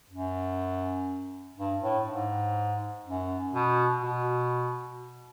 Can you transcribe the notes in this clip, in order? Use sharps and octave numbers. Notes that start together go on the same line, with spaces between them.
F#2
G2
A2
G#2
F#2
B2
B2